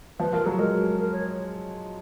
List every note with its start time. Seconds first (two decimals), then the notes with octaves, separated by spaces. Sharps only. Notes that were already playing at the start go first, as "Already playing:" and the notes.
0.20 F3 B4
0.33 F3 A#4
0.46 F#3 F#4
0.59 G#3 A#4
0.98 A#4
1.12 C#5